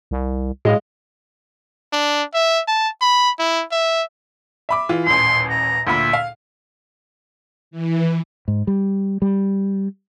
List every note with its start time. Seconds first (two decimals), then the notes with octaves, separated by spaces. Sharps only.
0.11 C2
0.65 A2 G#3 D#5 F5
1.93 D4
2.34 E5
2.68 A5
3.01 B5
3.39 E4
3.72 E5
4.69 E5 B5 D6
4.89 E3 F4
5.06 D#1 A1 C6
5.49 A#5
5.87 D2 A#2 E5 B5
6.13 F5
7.71 E3
8.48 G#2
8.67 G3
9.22 G3